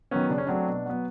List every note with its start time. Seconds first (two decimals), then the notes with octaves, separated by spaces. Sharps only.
0.11 D#3 F#3 B3 C#4
0.30 C#3 D4
0.38 C#4
0.47 F#3 A3 C4 D4
0.67 B2
0.86 F#3 B3